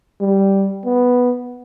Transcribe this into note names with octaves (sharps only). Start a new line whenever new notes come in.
G3
B3